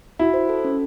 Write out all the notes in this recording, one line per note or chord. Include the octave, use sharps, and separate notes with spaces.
E4 F#4
C5
A4
C#4